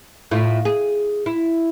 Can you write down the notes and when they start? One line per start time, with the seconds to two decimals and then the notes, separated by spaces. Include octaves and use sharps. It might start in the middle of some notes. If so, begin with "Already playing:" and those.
0.31 A2 E4 F4
0.65 G#4
1.26 E4